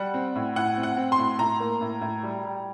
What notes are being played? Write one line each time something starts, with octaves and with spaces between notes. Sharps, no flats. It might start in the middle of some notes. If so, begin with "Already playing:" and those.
Already playing: G3 F#5
C4
A2
A2 F#5
C4
F#5
C4
C6
A2
A2 A#5
A#3
A2
A2
G3
G3